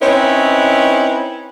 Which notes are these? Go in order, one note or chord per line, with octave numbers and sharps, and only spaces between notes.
C4 C#4 D#4 E4 B4 C#5